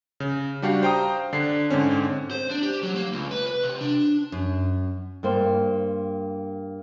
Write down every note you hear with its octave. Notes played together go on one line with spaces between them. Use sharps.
C#3
G3 D4 F#4 G4 F5
C5 F5 G5 A#5 D#6
D3 D4 C7
G#2 D3 C4 C#4
C5
D4
G4
F#3
A#3
C#2
B4
B4
C3
D4
F#2
G2 A#3 C5